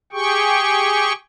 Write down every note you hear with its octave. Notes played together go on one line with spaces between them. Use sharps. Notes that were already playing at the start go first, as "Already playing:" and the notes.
G4 G#4 G5 C#6